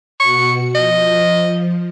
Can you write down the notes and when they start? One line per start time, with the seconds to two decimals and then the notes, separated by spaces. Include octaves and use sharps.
0.20 B2 F#4 C#6 C#7
0.75 F3 D#5